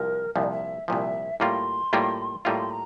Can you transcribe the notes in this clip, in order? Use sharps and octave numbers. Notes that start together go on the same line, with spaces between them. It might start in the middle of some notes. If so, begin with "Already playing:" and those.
Already playing: C2 F3 A#4
C2 A#2 F3 E5
D5
E5
C2 A#2 F3 E5
A2 G3 A#3 F4 C6
A2 G3 A#3 F4
A2 G3 A#3 F4 A#5
C6
A#5